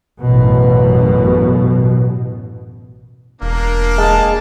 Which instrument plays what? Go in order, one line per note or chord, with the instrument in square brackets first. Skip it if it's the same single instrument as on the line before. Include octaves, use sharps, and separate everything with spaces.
[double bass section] A1 F#2 B2
[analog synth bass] E1 [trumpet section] A#3 D4
[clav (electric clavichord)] G#3 [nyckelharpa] A5